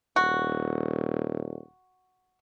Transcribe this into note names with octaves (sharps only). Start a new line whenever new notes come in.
D#1 F#4